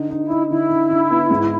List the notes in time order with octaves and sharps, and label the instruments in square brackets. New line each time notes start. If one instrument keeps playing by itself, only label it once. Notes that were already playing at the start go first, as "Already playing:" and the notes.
Already playing: [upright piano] D3 D#4
D#4
[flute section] E4
[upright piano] D#4
[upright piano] D3 [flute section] E4
[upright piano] D3
D3
B3
G#2